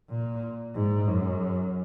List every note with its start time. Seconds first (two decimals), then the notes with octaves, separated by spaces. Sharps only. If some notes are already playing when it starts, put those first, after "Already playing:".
0.09 A#2
0.75 G#2
1.08 F#2